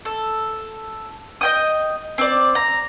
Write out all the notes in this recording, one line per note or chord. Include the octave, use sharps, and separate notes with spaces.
A4
D#5 G5 D#6
C4 D5
A#5